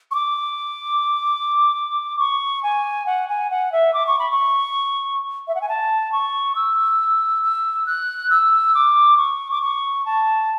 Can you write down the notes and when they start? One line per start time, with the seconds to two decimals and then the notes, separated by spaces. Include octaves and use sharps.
0.11 C#6
0.15 D6
2.19 C#6
2.63 G#5
3.06 F#5
3.28 G#5
3.50 F#5
3.72 E5
3.94 D6
4.07 C#6
4.19 B5
4.31 C#6
5.48 E5
5.55 F#5
5.61 G#5
5.69 A5
6.12 C#6
6.55 E6
7.43 E6
7.86 F#6
8.30 E6
8.75 D6
9.17 C#6
9.51 D6
9.62 C#6
10.06 A5